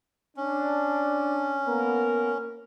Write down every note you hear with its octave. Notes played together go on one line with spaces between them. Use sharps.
C#4 D4
A#3 B3 A#4